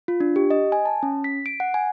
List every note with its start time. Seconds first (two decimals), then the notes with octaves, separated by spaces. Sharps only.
0.08 F4
0.20 D4
0.36 G4
0.50 D#5
0.72 G#5
0.85 A5
1.03 C#4
1.24 B6
1.46 D7
1.60 F#5
1.74 G#5